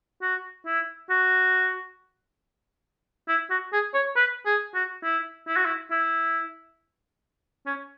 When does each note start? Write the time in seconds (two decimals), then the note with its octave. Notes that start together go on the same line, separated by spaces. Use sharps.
0.22 F#4
0.66 E4
1.10 F#4
3.28 E4
3.50 F#4
3.73 G#4
3.94 C#5
4.16 B4
4.46 G#4
4.75 F#4
5.04 E4
5.47 E4
5.56 F#4
5.65 E4
5.91 E4
7.66 C#4